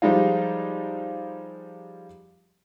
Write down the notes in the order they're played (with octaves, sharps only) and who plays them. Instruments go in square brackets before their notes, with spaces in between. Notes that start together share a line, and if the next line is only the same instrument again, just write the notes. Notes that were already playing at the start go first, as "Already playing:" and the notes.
[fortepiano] F3 G3 G#3 D#4 F4